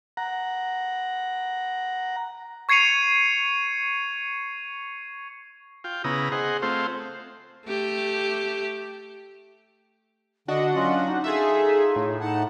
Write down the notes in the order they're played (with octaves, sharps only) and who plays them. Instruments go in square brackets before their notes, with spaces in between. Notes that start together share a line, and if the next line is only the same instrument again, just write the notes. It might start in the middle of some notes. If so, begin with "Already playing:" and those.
[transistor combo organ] F#5 A#5
[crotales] C#6 G#6 C7 C#7 D#7 F7
[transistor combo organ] F4 G5
C#3 B3 E4 A#5 D#6
G#4 C5 D#5 F#5
A3 C4 F4 C5
[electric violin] A3 G4
[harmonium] D3 [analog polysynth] D4 F#4 F#5 [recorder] D#5
[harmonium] F#3 C#4 F4 [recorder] D#5
[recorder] D#4
[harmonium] F4 [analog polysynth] G#4 A4 E5
[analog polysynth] A2
[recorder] D#4 [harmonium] F#5 A5